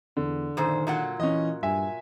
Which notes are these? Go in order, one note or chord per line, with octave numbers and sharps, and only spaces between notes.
E2 D3
F#2 A#2 D#3 C5
A#2 F#3 F#5
E3 C#4 D#5
G2 E5 G#5